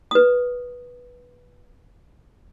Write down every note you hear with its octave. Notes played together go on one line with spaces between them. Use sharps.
B4 D#6